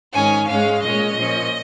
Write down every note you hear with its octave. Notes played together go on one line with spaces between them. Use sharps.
G#2 D#3 C#4 G#5
G#2 G#3 C#4 F5
A#2 G#3 C#4 D#5
A#2 F3 C#4